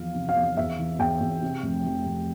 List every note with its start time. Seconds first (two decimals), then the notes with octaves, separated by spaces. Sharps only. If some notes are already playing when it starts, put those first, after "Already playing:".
Already playing: E2 F3 F5
0.14 C3
0.29 F5
0.37 E2
0.57 E2 E5
0.79 E3
0.99 E2 G5
1.20 E2
1.42 C3
1.63 F1
1.85 F1
2.06 F1